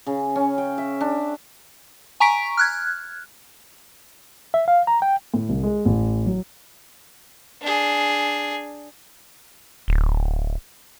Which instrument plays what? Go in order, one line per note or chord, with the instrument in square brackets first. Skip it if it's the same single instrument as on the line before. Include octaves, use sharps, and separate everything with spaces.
[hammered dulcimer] C#3
C#4
G5
E5
D4
[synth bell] G#5 A#5 C#6 B6 D7
F6 F#6 G#6
[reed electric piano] E5
F5
A#5
G5
[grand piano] A2
C2
G#3
A1
F#3
[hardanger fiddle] D4 G#4
[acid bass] D1